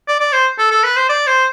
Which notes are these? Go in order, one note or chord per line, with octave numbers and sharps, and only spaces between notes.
D5
D5
C5
A4
A4
B4
C5
D5
C5